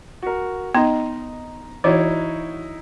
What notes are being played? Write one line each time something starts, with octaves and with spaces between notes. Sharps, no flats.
F#4 A#4
B3 D#4 D#5 A#5 C6
E3 D#4 E4 F#4 C#5 D5